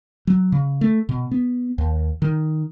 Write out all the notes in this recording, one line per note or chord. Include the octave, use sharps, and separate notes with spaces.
F#3
C#3
A3
B2
B3
D#2
D#3